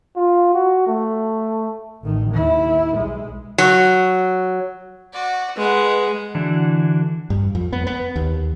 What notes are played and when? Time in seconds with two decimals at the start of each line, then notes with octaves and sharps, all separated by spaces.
0.16 F4
0.53 F#4
0.87 A3
2.03 A1 D#3
2.32 D#2 E4
2.97 B1 G#3
3.58 F#3
5.13 F#4 D5
5.57 G#3 B4 D#5 F#5
6.35 D3 E3 D4 E4 F#4
7.30 G2
7.55 F2
7.73 B3
7.87 B3
8.16 D#2